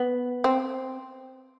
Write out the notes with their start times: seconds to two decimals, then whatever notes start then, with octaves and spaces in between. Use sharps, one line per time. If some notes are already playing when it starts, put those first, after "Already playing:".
Already playing: B3
0.44 C4